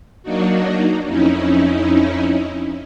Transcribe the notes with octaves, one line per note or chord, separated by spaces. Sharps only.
F#3 A#3 D4 D#4 F#4
F2 C#4 D#4 E4